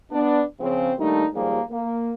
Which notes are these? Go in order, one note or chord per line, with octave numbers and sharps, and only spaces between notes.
B3 D4
C#3 F3 C4
D#3 G3 A3 A#3 D4 D#4
D#2 G#2 F3 G3 G#3 A#3
A#3